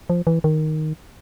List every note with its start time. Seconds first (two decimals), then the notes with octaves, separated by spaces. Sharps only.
0.10 F3
0.27 E3
0.44 D#3